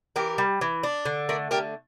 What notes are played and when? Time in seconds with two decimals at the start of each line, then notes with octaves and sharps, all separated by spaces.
0.16 E3 G4 A#4
0.38 G3
0.61 E3
0.83 D4
1.05 D3
1.29 A3 A#4 D5
1.51 D3 G4 A#4